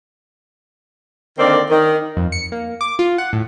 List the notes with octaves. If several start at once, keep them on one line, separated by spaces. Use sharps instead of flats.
D3 D#3 A#3 C4 D5
D#3
F2
C#7
A#3
D6
F4
F#5
A2